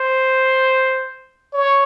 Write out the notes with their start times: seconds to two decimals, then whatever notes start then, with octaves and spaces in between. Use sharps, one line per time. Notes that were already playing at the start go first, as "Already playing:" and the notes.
Already playing: C5
1.54 C#5